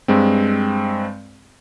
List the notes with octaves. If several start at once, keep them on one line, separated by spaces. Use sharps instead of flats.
G2 G#3 C4